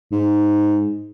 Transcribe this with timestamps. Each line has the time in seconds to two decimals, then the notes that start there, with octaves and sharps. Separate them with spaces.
0.12 G#2